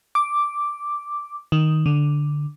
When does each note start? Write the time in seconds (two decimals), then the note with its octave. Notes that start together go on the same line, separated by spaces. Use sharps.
0.15 D6
1.52 D#3
1.86 D3